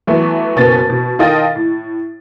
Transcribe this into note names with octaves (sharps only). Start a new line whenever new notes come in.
E3 F#3 A3 B3
F#1 B2 B3 C#4 A6
B2
D#3 F4 A4 D#5 G5 A6
A2